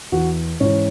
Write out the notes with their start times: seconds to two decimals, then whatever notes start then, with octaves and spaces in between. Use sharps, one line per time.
0.12 E2 E3 F#4
0.60 G#2 E3 C#4